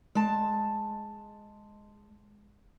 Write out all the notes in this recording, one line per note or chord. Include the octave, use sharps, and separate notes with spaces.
G#3 A5